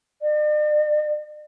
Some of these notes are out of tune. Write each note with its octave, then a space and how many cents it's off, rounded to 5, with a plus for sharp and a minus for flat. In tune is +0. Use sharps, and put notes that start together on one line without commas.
D5 +45